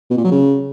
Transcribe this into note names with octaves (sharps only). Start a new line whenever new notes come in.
B2
A#2
F#3
C#3